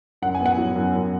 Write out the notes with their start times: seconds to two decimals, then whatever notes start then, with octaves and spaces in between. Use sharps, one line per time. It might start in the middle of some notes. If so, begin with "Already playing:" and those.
0.22 F#2 F#5
0.35 G#5
0.40 B3
0.46 F#5
0.58 F#3
0.75 F#2
0.94 F#2